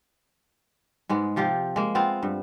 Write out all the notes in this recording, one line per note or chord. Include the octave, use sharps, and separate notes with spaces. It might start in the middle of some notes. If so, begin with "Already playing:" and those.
G#2 G#3 B3
C3 F3 F4 G4
G#3 A#3
B3 C4 F4 F5
G2